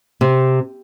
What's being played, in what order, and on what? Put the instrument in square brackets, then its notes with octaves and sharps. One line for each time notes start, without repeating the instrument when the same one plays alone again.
[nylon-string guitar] C3